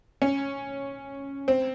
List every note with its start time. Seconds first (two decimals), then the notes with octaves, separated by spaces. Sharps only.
0.22 C#4
1.48 C4